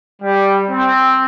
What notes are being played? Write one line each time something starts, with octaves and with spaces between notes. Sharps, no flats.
G3
C4